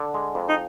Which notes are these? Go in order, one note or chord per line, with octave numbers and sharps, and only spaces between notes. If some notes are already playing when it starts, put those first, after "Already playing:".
Already playing: D3
G#3
F2
D#4